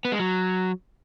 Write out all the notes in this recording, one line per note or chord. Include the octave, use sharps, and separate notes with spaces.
B3
G#3
F#3